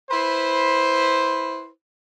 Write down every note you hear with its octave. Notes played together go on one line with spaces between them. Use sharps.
E4 B4 C5